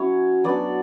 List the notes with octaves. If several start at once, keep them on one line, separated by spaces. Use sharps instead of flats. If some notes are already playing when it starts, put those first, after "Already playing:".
Already playing: F#3 C#4 E4 C#5
F#3 B3 D4 D5